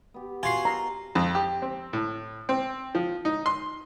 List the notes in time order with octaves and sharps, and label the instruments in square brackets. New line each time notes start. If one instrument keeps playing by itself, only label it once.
[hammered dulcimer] B3 G4
[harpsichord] F4 F#4 [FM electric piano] G#5 C6 C7
[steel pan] A#5
[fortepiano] F2
G4
C4
A2
C4
F3
D#4
C6